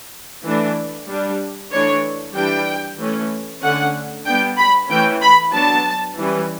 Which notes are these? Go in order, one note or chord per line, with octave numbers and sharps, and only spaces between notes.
E3 A3 D4
G3 D4
E3 A3 D4 C#5
E3 G3 D4 G5
E3 A3 C#4
D3 A3 C#4 F#5
G3 B3 D4 G5
B5
E3 A3 C#4 G5
B5
F#3 B3 D4 A5
E3 G3 C#4